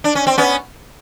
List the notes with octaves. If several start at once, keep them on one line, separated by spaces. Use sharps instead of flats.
D4
C#4
C4
B3 C#4